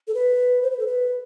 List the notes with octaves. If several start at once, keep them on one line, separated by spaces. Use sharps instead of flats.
A4
B4
C5
B4
A4
B4